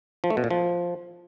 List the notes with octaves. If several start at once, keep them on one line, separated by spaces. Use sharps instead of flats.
F3
A3
B2
A#2
F3